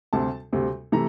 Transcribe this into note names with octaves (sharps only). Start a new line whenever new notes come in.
D2 C3 G3 C4 A5
D2 C3 G3 C4
C3 E3 A3 A#5